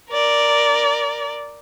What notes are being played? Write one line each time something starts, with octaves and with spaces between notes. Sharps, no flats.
A#4 D5